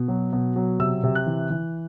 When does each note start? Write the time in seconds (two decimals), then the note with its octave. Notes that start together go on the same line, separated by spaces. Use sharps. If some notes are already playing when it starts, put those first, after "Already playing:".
Already playing: B2
0.08 F#3
0.33 B2
0.56 F#3
0.79 C3 E6
1.04 C3
1.15 F#6
1.26 E3
1.50 E3